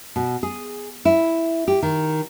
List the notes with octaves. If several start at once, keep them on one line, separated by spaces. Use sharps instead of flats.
B2
G#4
E4
G4
D#3